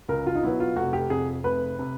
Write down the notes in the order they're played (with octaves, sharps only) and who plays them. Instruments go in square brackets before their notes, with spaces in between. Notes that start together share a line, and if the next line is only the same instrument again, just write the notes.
[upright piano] C#2 A#4
F4
D#4
B2 F#3 B3 E4
F4
F1 F#4
G4
F2 C3 G#4
F1 B4
C3